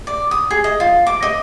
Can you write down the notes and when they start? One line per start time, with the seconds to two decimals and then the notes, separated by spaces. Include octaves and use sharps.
0.07 D5
0.31 D#6
0.51 G#4
0.64 D#5
0.80 F4
1.07 D6
1.23 D#5